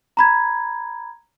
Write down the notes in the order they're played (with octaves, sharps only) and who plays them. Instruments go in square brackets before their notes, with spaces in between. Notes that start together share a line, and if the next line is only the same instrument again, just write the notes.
[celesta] A#5 B5 G#6